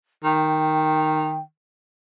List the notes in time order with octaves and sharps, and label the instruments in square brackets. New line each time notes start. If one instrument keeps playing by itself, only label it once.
[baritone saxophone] D#3 [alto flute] G5